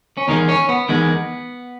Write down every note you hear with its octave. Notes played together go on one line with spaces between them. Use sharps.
C#4
E2 D#3 G#3 D#4
C#4
B3
E2 D#3 G#3 B3